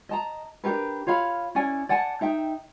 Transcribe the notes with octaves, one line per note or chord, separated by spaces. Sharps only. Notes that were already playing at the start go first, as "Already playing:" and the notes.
D#5 A5 A#5
D4 G4 A#4 B4
F4 C#5 F5 B5
C#4 E4 D5 G#5
D5 F#5 G#5 A5
D#4 E5 G5